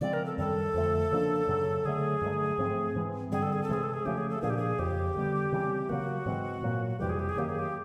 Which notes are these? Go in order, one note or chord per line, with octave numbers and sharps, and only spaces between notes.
C#3 F3 G#3 C4 D5
A#4
A4
F#2 D#3 G3 A4
F2 D3 F3 A3
C#3 F3 A#3 D4
F#2 C#3 F#3
D3 F#3 A3 G#4
G2 D3 F#3 A3
G#2 F3 A3 C4
G#2 E3 G#3 C4
G2 D3 G3 C4 G#4
A4
G#4
A4
C3 E3 G#3 G#4
A4
G#4
C#3 F3 A3 C#4 G4
G#4
A4
A#2 F3 A#3 D4 G#4
G4
G#4
F2 C#3 F3 G4
D3 G3 B3
C#3 E3 G3 C4
C#3 F#3 A#3 F#4
G#2 E3 G#3 C4
A#2 F#3 A#3
F2 C3 E3 G3 G4
G#4
G4
G#4
F#2 D#3 F#3 A#3 G4
G#4
G4